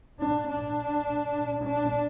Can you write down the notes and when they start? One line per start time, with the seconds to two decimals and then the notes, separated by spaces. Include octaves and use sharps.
0.19 D4
0.48 D4
1.64 D4